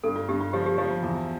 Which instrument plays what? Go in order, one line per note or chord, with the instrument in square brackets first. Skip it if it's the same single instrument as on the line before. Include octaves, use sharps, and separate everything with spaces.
[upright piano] G2 [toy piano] A4
[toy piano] F4
[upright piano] G2 [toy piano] G4
[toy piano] F4
[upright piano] F3 [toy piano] G4
[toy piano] G4
[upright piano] F3 [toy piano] G4
[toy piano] F4
[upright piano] E2 [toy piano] F4